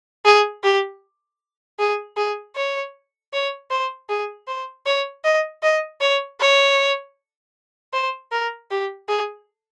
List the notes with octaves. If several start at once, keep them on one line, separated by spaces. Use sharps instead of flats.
G#4
G4
G#4
G#4
C#5
C#5
C5
G#4
C5
C#5
D#5
D#5
C#5
C#5
C5
A#4
G4
G#4